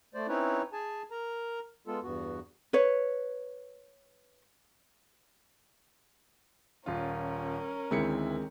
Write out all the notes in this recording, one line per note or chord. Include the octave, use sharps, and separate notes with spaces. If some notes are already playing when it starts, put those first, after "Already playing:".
A3 C5 D5
C4 C#4 D#4 E4 B4 C#5
G#4 G#5 A5
A#4 A#5
G#3 B3 F4 A4
E2 G2 B3 F#4
B4 C#5
D#1 C#4 F4 A#4
D2 D#3 G#3 C4 E4 C#7